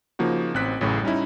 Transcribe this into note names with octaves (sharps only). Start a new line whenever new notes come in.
C#3 F3 A#3 D#4 F#4
A1 C4 F#6 B6
A1 F#2 A2 C#3
G3 C#4 D#4 E4